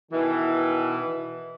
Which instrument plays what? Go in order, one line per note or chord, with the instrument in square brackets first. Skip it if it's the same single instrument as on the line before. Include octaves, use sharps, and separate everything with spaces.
[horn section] B2 D#3 E3